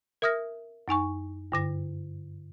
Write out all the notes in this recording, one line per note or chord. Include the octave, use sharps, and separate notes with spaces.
A#4 E5 D#6 F6 A#6
F#2 D#4 G#5 C#6
G2 D3 A#6